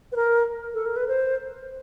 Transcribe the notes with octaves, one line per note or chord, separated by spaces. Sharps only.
B4
A#4
A4
A#4
B4
C5